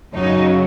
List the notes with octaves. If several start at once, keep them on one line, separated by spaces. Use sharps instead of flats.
F#2 C#3 F#3 D#4